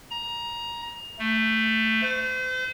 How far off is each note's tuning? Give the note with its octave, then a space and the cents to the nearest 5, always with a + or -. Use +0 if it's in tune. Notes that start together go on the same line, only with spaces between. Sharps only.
A#5 +20
A3 +10
C5 -40